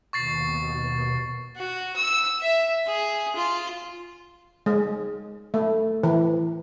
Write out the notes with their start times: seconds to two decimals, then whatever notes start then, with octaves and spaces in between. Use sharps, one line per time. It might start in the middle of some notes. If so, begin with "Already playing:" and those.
0.13 D#2 B2 C#6 A6 C7
1.57 F#4
1.96 E6
2.41 E5
2.87 G#4
3.36 F4
4.66 G#3
5.54 A3
6.03 E3